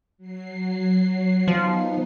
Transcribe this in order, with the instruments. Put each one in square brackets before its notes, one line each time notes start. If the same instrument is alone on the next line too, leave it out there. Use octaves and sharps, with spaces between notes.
[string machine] F#3 C7
[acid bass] F3 [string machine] B3 D#4